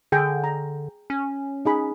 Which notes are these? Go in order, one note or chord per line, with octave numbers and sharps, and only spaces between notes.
D3 G#4 G5
A#5
C#4
D#4 G#4 B5